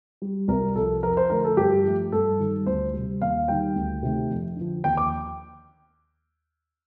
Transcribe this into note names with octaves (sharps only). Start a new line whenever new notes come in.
G3
C2 A#4
C3 F3 A4
F2 A#4
C5
D3 F3 A3 A#4
A4
G2 G4
F3 A3
G2 A4
D#3 G3
D2 C5
G3
C3
D#2 F5
D#3 G3 G5
D2
C3 D#3 A3
F2
D3 F3
D#2 G5
D6